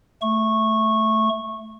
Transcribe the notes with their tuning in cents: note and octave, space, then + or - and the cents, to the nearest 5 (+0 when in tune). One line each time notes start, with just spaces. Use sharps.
A3 +0 C#6 -15